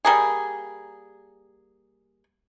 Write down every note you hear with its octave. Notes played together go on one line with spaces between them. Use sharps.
G3 A#3 G#4